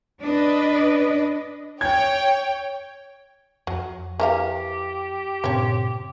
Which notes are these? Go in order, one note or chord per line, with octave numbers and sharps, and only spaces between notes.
D4 B4 D#5
C#5 G5 G#6
F2 F#3
E3 G4 A#4 F5
G2 A#2 C#3 C4 C#5